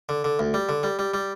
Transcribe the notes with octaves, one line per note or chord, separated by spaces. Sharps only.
D3
D3
D2
G3
D3
G3
G3
G3